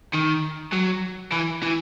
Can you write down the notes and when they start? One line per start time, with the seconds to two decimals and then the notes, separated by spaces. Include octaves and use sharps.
0.14 D#3
0.73 F#3
1.32 E3
1.63 E3